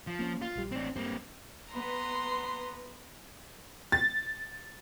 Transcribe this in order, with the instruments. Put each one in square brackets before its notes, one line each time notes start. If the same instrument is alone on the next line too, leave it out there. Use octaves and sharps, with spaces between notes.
[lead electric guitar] F3
[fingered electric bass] A#3 C#4
[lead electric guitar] F4
[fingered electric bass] A#1 G3
[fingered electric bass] A1 [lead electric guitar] C4 D4
[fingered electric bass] G2 [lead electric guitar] A#3 C4
[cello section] B3 B4 [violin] A#5 C6
[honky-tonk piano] A6